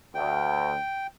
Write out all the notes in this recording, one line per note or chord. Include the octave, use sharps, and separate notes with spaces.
D2 G5